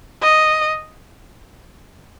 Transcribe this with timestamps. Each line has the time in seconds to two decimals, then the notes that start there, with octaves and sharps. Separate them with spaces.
0.22 D#5